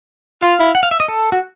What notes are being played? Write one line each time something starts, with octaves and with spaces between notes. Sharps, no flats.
F4 F5
E4
F#5
F5
E5
D#5
A4
F#4